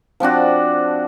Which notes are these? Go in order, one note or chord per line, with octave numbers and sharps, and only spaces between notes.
F3 C4 D4 F#4